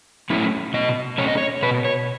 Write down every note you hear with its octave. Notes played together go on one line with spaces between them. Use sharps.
F#3 A3 C#4 E4
B2 D#5
F#3 A3 C#4 C#5
D#5
C#5
B2 B4
C#5